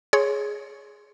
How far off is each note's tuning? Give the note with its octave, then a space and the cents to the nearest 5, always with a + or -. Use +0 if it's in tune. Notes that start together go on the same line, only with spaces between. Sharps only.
G#4 +5 C#5 +0 C6 -5